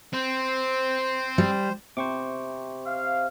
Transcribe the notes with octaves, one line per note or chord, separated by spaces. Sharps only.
C4 C5
G3
C3 C5 C#6 D6
F5